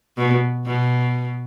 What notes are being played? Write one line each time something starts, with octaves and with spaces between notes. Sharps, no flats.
B2
B2